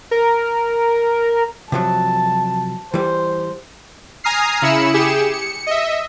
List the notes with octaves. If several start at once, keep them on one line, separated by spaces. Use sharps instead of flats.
A#4
C3 F3 F#3 A5
E3 G3 C5
G#5 A#5 D#6 F6 C7
C#3 E4 B5 C#7 E7
G4 G#4 C#7 E7
C#7
D#5 E5